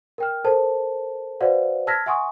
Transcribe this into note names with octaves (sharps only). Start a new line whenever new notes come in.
A#4 G5 F6
A4 A#4 C5 A5
F#4 B4 C5 D5 F5 F#5
A5 E6 F6 G#6 A#6 B6
E5 F#5 G#5 C6 C#6 D#6